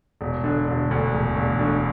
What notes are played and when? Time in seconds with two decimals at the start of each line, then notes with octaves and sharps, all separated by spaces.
0.21 E1
0.44 D3
0.68 E1
0.91 D2
1.14 E1
1.36 E1
1.59 D3